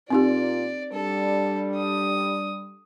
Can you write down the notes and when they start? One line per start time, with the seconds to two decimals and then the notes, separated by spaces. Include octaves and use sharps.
0.10 A#2 C4 D#4 F4 G4 D5
0.93 G3 D4 A4
1.76 D#6